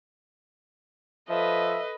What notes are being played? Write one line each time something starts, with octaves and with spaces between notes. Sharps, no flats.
F3 A4 B4 D#5 E5